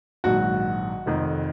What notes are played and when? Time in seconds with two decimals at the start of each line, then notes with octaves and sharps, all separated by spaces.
0.24 A#1 G#2 D#3 F#3 F#4
1.06 F1 F2 D#3